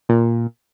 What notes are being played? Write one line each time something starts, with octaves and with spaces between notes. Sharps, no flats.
A#2